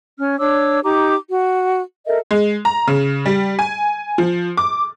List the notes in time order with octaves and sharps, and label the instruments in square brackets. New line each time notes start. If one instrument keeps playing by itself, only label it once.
[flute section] C#4 F6
D4 C#5 D6 E6
D#4 G4 A#5 D6
F#4
A4 A#4 D#5 E5
[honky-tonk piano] G#3
A#5
C#3
G3
G#5
F3
D6